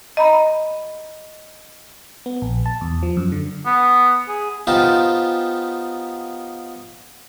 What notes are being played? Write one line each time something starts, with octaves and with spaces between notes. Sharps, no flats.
D#5 A#5 B5
B3
A#1
A5
E2
F3
F#2
D3
B3
G#4
B3 D#4 F4 G4 C5 A5